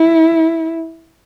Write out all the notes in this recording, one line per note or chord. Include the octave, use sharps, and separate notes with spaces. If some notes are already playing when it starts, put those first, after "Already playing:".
Already playing: E4